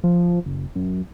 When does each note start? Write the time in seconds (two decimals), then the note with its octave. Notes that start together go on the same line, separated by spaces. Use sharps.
0.04 F3
0.46 F#1
0.76 F#2